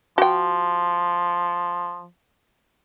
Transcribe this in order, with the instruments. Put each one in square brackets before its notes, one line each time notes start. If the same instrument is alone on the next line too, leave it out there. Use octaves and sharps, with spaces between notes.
[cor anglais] F3 [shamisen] F#4 G5